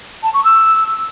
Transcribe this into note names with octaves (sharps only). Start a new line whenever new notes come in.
A5
C#6
E6